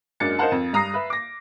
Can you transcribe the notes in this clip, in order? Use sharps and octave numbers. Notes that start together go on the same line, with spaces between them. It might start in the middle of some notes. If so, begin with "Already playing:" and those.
F#2 G#3 A#3 D4 A6 C#7
D#4 A#4 C5 F5 F#5 A5
F2
G2 A#5 D#6 A#6 C7
B4 E5
D6 A#6